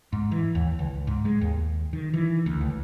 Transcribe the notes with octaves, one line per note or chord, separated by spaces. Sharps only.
G#2
E3
D#2
C#2
G#2
G#3
D#2
D#3
E3
D2
C#2